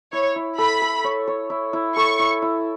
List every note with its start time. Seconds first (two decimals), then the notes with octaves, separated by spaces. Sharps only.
0.13 E4 C#5
0.36 E4
0.58 A4 B5
0.82 A4
1.04 C#5
1.27 C#5
1.50 E4
1.73 E4
1.96 A4 C#6
2.19 E4
2.42 E4